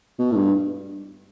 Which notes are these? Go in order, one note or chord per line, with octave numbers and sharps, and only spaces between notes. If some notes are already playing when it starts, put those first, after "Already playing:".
B2
A2
G2